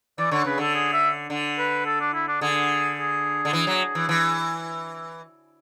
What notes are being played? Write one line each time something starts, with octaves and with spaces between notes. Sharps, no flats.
E3 D5
D3 C#5
C#3 B4
D3 A4
G#4
E5
D3
B4
A4
D4
E4
D4
D3 G#4
G#4
D3
E3
F#3
E3
E3